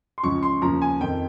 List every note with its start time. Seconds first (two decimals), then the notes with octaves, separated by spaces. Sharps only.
0.18 C6
0.23 C#2 C#3 F3 C#6
0.43 C6
0.62 D#2 C#3 F3 A#5
0.82 G#5
1.01 F2 D#3 G5